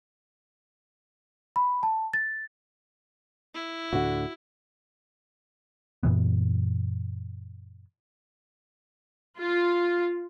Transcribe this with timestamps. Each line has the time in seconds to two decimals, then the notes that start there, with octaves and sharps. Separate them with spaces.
1.56 B5
1.83 A5
2.13 A6
3.54 E4
3.93 D2 A2 D3 F#4
6.03 F#2 A#2 E3 B3
9.38 F4